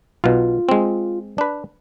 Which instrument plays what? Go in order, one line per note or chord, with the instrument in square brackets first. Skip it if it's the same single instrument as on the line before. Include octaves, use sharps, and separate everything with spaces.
[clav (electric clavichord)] B1 B2 [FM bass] F4
[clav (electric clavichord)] G#3 C4
D4 B4